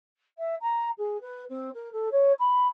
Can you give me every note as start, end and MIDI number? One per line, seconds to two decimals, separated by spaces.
0.38 0.55 76
0.61 0.89 82
0.97 1.20 68
1.20 1.44 71
1.48 1.69 60
1.74 1.92 70
1.92 2.08 69
2.11 2.32 73
2.38 2.66 83